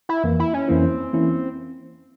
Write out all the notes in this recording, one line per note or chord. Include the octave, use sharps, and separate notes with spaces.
E4
F2 E3 A#3
E4
C#4
F2 E3 A#3 C4 C#4 E4
E3 A#3 C#4 E4